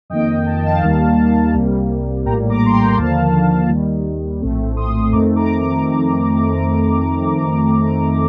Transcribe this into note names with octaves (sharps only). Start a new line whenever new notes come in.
F2 D#3 A#3 D#5 G5
A5
G5
F5 A5
D#2 D#3 G3 A#3
C2 C3 G3 A#3
A#1 A2 G3 A#3 G5 A#5
A#5 D6
C6
G5 A#5
G5
D#2 D3 F3 A#3 F5 A5
D#2 D#3 G3
A#1 A2 A3 C4
C6 D#6
F2 D#3 A3 C4 A#5 D6
A#5 D6
D6